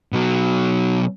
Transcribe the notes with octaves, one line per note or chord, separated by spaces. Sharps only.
B2 F#3